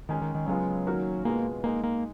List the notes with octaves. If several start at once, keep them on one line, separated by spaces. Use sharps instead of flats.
D#3 G#3 C#4 G#4
D#3
D#3
C#3 F#3 G#3 B3 F4 G#4
D#3 A#3 C#4 F#4 A#4
B2 G#3 A#3 B3 F4 G#4
G#3 A#3 D#4 G#4
A#3